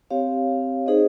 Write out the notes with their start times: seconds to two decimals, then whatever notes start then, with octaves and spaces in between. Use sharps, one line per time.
0.10 C4 G4 C#5 F5
0.86 D#4 G#4 C5 D#5